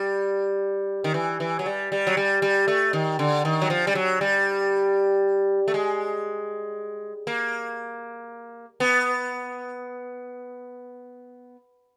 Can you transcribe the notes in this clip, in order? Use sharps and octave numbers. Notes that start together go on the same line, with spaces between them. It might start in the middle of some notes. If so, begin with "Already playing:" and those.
Already playing: G3
D#3
E3
E3
F#3
G3
G3
F#3
G3
G3
A3
D#3
D3
D#3
F#3
F3
G3
F#3
G3
A3
G#3
A#3
B3